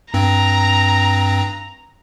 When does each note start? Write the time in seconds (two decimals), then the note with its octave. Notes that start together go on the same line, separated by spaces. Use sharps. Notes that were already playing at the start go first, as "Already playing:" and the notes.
0.14 G2 C4 A#5